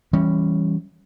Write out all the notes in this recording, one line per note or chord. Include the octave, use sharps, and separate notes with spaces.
E3 G3 C#4